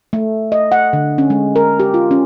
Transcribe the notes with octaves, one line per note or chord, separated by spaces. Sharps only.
A3
D#5
F#5
D3
C#4
G#3
A#4
G4
F4
C#4